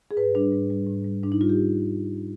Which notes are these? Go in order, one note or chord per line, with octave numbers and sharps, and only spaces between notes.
G#4
G#2 B4
G3 D4
G#2
G3
G#2
G3
G#2 D4
D#4
G3 F4
G4